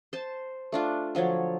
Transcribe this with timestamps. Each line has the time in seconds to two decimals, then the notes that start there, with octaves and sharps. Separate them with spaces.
0.13 C5 A5
0.72 A3 D4 F4
1.15 D3 F3 F#3 C#5